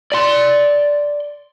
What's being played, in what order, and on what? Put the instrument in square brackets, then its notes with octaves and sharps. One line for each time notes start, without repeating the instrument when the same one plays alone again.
[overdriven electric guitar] D5 C6